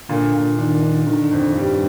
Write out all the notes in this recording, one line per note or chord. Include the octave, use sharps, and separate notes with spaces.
A#2 D3
A#2
D#3 D4
D4
D3 D#3
F2
G2 G3